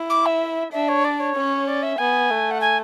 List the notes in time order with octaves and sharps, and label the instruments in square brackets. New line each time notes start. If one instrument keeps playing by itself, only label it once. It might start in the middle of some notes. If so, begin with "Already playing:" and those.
Already playing: [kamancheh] E4
[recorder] D6
E5
[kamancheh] D4 [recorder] E5
[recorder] C#5
D5
C#5
[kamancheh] C#4
[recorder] D5
E5
[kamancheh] B3 [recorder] G#5
[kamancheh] A3
[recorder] F#5
G#5